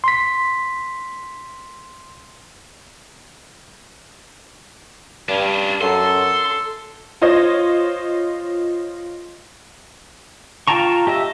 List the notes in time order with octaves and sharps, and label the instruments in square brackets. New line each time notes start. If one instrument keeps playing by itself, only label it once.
[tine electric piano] C6 B6
[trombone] G2 [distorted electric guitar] C#4 D4
[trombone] F#2 [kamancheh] A4 [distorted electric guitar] C6
[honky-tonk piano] F4 C5 C#5 D#5
[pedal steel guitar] F4 G5 A5 A#5 C#6
G4 D#5 E5